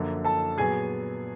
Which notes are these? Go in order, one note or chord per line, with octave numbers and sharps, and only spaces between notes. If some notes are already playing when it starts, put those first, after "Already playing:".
Already playing: F#2 D3 F3 A#3
A4 A5
A#2 F#3 B3 G#4 G#5